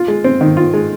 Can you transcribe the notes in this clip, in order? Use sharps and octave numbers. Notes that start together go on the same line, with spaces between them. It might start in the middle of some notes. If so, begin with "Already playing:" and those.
Already playing: F4
G#3
C4
D#3
F4
G#3